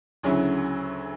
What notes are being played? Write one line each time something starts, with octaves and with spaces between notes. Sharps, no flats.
D2 C#3 F#3 C#4 E4